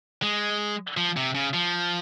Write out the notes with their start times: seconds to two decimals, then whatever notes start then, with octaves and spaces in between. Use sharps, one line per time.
0.22 G#3
0.97 F3
1.17 C3
1.35 C#3
1.54 F3